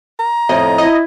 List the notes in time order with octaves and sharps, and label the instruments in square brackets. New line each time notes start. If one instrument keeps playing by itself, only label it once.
[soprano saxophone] A#5
[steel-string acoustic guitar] F2 A2 [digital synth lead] D#5
[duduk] E4 [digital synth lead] D#5